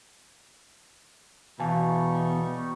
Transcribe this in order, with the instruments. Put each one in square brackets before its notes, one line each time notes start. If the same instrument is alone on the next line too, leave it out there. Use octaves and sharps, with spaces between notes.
[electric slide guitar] E2 [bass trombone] B2 [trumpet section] G3 D#4 C#6 [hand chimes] F5 G#5 A5